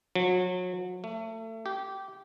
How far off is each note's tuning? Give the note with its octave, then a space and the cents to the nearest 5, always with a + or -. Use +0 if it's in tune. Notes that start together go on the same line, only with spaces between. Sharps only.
F#3 -30
A3 +30
G4 -15